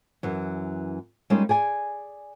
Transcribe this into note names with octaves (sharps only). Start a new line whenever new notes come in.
F#2 E3
G3 G#3 A#3 C#4 D#4 F4
G#4 D5 G#5